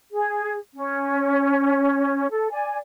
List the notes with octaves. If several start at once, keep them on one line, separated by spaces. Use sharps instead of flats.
G#4
C#4
A4
D5 G#5